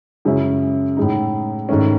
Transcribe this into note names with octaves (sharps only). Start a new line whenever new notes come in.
F#2 C#3 G#3 C#4 E4
A2 G#3 D#4
G#2 D#3 A3 C#4